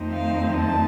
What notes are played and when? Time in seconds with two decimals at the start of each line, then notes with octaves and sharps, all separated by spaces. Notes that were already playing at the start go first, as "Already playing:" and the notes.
Already playing: F2 D#3 A3 C4 D#4
0.12 F5
0.58 A5